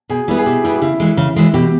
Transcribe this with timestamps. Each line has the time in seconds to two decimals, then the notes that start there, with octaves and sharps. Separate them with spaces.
0.10 B2 G#4
0.28 G3 B3 E4
0.39 G#4
0.46 B2 G4
0.64 G3 B3 E4
0.78 G4
0.81 C#3 E4
1.00 E3 G#3
1.17 C#3
1.36 E3 G#3 E4
1.54 B2 G4